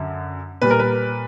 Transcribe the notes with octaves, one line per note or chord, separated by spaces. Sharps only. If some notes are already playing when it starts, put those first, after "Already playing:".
Already playing: F#2 D3
A#2 G3 B4
A#4
B4